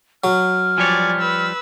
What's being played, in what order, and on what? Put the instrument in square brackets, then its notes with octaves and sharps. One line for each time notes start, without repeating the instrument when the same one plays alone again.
[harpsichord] F#3 [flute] F6
[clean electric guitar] F3 G3 C#5 [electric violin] D5 G#5
[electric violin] B4 E6